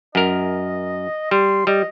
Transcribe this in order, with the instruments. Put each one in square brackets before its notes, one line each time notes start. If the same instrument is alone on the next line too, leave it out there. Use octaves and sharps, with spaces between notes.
[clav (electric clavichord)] F#2 A#4 [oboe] D#5
[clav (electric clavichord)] G3 [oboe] C6
[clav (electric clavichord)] G3 [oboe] D#5